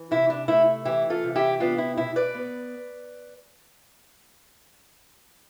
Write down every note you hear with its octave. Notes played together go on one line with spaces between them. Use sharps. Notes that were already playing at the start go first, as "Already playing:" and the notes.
Already playing: E3
C3 E4
D4
A3 E4
E3 E4 G4
F4 A4
C3
E4 G4
B3 D4 F4
E4
B2 E4
B4 D5
B3